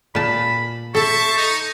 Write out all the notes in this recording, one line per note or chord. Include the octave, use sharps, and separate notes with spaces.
A#2 A5 B5
A4 C5 E5 A5 C#6
D#4